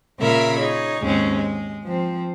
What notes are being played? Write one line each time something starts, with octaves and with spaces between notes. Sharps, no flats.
A#2 C#3 A#3 A#4 E5 B5
D#4 G#4 C#5
D#2 G#2 G#3 C4 C#4
G#3
F3 C4